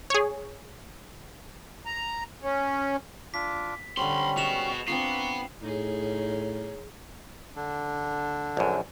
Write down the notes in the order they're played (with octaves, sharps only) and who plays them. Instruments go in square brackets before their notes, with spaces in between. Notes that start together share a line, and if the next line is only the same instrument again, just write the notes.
[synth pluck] G#4 C#5
[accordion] A#5
C#4
[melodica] D4 F4 D6 [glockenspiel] B6
[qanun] D3 C5 [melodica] G3 C#4 [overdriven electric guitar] B5 C6
[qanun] G#3 D#5 [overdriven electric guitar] B3 F#4 [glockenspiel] E7 F7
[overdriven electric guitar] B3 [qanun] C4 D4 F4 [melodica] A#5 C#6 [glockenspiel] C7
[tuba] A2 [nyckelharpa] D#4 G#4 [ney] C#5
[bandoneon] D3 D4
[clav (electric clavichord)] A#1 F#2